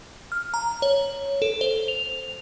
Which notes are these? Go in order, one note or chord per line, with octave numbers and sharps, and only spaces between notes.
F6
A#5
C#5
A4
C5
F7